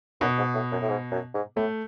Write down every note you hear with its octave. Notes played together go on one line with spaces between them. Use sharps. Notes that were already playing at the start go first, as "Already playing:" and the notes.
F#2 B2
G#2
A2
F#2
A2
G#2
F#2
G#2
A2 A3